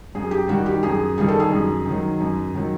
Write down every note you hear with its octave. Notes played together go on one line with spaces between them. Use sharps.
F#2 G#4
G4
D#3 G3 F#4
G4
F#2 G#4
D#3 G3 G#4
A4
G#4
F#2
D#3
F#3
F#2
D#3 F#3